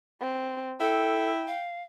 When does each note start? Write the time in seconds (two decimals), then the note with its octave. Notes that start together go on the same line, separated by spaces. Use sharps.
0.21 C4
0.80 E4 A4 G5
1.47 F5